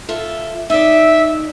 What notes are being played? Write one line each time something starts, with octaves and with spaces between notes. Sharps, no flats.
F4 A4 E5
D#4 D5 E5